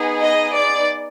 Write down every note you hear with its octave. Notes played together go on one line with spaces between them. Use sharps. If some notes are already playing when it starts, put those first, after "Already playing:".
Already playing: B3 D#4 G#4
D#5
D5